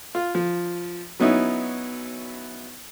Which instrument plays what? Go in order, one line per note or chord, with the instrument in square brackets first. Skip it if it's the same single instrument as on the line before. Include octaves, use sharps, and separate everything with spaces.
[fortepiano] F4
F3
F#3 B3 C#4 D#4 E4